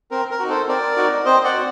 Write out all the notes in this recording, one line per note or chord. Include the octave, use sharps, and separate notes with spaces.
C4 A#4
A#4
D#4 F#4
A4 C5
C4 A#4 D5
D#4 F#4
C4 C5 D#5
D5 F#5
F#4